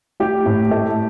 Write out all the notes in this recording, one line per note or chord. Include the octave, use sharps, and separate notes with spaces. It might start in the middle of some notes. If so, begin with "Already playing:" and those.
A3 G4
A2
A3